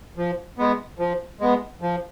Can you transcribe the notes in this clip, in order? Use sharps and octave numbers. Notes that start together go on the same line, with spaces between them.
F3
G#3 B3
F3
G#3 B3
F3